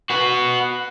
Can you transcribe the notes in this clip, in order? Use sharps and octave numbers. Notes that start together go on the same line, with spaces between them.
F#4 B4